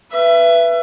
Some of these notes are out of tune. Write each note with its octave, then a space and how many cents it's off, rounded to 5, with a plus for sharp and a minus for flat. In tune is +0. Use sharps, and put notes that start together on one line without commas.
B4 +0 E5 +25